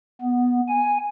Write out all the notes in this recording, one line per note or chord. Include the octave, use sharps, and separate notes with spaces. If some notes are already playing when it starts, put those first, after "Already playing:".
B3
G#5